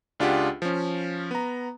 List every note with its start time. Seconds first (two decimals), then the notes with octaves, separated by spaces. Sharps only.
0.20 C#2 D4 F4 G4 G#4 F#5
0.62 F3 C#4
1.31 B3 A#5